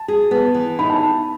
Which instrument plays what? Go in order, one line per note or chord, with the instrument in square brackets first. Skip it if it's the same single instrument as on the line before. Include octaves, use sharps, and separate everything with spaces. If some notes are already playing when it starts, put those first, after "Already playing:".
Already playing: [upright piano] A5
[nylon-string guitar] G#4
B3
E3
[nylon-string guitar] D#4 [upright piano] B5
[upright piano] A5